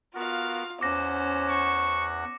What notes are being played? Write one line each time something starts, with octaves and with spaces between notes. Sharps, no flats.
B3 F4 F#4 A#4 F5
E2 C#4 C5 F#5 D6 A#6
C#6